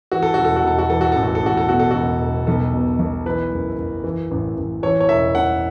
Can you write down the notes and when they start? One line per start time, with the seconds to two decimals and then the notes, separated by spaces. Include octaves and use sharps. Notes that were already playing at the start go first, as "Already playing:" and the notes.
0.12 E3 F#4
0.23 A4
0.34 E1 F#4
0.45 A4
0.56 F#4
0.64 E1 A4
0.79 F#4
0.90 E3 A4
1.01 F#4
1.12 A1 A4
1.23 F#4
1.35 A4
1.43 A1 F#4
1.57 A4
1.69 B2 F#4
1.80 A4
1.91 E1 F#4
2.21 E1
2.47 B1 A4
2.74 B2
2.99 B1
3.26 E3 B4
3.52 F#1
3.78 F#1
4.04 E3
4.31 A1
4.56 A1
4.83 E3 C#5
5.00 C#5
5.09 E1 E5
5.35 E1 F#5